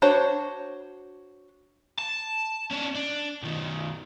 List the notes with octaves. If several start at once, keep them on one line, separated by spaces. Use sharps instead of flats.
D4 F#4 C5 C#5
A5
C#4 D4
D4
B1 D#3